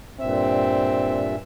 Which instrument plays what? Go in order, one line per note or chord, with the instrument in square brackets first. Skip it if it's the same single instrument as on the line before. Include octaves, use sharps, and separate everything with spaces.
[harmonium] G2 A#2 E5 [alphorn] C4